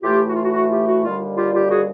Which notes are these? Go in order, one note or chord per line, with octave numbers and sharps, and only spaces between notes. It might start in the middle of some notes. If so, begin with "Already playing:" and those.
A2 E3 A3 F4 G4
F#4
F4
F#4
F#4
F4 G4
F#4
D#2 D3 G3 F4
F4 G4
F4 G4
F#4 G#4